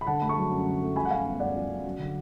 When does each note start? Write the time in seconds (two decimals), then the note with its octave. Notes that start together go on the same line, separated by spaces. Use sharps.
0.01 B5
0.07 D3 F#5 A5
0.22 A3 B5
0.29 A5 C#6
0.37 F#3
0.52 F#2
0.66 D3
0.82 A3
0.96 F3 G#5 B5
1.05 F#5
1.11 F#2 F5 G#5
1.26 B3
1.40 F#2 D5 F#5
1.55 F3
1.70 F#2
1.85 F#3
1.99 D3